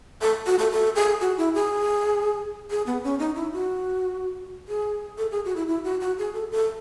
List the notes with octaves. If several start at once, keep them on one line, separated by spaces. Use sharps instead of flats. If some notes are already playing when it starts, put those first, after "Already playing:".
A4
F#4
A4
A4
G#4
F#4
E4
G#4
G#4
B3
C#4
D#4
E4
F#4
G#4
A4
G#4
F#4
E4
E4
F#4
F#4
G#4
A4
A4